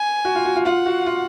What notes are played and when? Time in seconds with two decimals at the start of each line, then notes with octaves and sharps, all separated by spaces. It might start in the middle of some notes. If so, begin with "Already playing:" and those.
Already playing: G#5
0.25 F#4
0.35 F4
0.45 F#4
0.56 F4
0.66 F4 F#5
0.86 F#4
1.06 F4